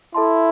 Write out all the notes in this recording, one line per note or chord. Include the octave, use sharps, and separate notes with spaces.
E4 A4 E5 A5 C6